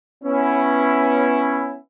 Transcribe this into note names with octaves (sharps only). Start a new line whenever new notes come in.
B3 C#4 E4